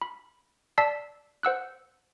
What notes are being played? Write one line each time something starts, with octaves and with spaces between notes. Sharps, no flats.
B5
D5 A5 E6 B6 C7
C5 F#5 E6 F#6